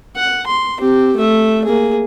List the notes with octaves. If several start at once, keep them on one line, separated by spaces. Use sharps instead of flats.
F#5
C6
C4 G4
A3 E5
A#3 G#4